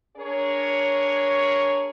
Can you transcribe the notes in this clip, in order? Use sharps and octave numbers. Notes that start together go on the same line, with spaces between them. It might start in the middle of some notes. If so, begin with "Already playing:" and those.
D4 G#4 A#4 C#5